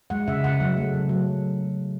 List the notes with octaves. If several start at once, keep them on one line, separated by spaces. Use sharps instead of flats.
G#3 F#5
C#3 E5
C#3 F#5
F#3
A3
C#3
F#3